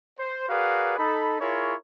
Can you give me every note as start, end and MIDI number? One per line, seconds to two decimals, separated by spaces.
0.19 0.45 72
0.49 0.97 66
0.49 0.97 68
0.49 0.97 70
0.49 0.97 71
0.49 0.97 74
0.49 0.97 77
0.98 1.38 63
0.98 1.38 69
0.98 1.38 83
1.40 1.74 64
1.40 1.74 65
1.40 1.74 68
1.40 1.74 70
1.40 1.74 73